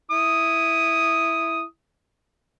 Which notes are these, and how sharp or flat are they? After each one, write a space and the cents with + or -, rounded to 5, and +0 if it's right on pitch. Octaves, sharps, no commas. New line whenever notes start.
E4 +0 D#6 +0